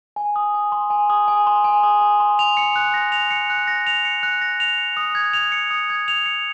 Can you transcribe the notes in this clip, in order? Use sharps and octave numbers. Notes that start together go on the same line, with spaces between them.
G#5
D#6
G#5
C6
G#5
D#6
G#5
C6
G#5
D#6
G#5
C6
F7
C#7
F#6
A#6
F7
C#7
F#6
A#6
F7
C#7
F#6
A#6
F7
C#7
D#6
G#6
F7
C#7
D#6
G#6
F7
C#7